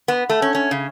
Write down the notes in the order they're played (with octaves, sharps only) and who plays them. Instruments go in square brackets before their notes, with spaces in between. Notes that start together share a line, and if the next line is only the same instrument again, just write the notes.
[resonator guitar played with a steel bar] B3
A3
C#4
C#4
C#3